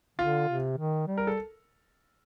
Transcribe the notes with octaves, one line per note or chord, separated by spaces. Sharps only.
D3 F4
C3
D#3
G3
A#4
A4